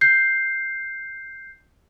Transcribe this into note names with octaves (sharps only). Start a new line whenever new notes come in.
G6 C7